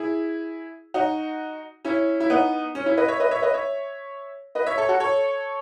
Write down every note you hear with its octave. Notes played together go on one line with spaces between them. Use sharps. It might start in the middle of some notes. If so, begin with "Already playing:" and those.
Already playing: E4 G#4
D#4 F#4
C#4 E4
E4
B3 D#4
C#4
C#4 E4
B4 D#5
C#5 E5
B4 D#5
C#5 E5
B4 D#5
C#5 E5
B4 D#5
C#5 E5
A4 C#5
F#4 A4
A4 C#5